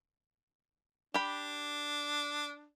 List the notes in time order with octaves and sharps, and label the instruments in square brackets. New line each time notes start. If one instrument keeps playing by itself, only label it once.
[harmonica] D4 [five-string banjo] G4 B5